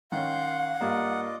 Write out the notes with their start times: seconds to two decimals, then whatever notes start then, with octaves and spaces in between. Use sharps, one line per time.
0.12 D#3 C#4 F5 F#5 C6 G6
0.81 G2 A#3 F4 D5 D#5